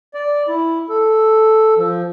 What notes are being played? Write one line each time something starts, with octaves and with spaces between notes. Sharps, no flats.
D5
E4
A4
F3